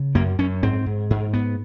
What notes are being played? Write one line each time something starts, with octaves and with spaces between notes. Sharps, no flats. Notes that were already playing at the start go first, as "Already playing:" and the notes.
Already playing: C#3
F#2 A#3
F#2 C#4
G#2 C4
G#2
G#2
G#2 B3